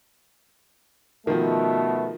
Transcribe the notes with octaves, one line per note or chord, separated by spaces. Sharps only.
B2 D#3 F3 A3